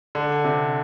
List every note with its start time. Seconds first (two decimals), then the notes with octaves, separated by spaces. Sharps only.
0.15 D3
0.44 C3